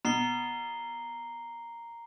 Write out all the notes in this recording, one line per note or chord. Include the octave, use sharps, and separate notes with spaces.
B2 A#5 C7 G7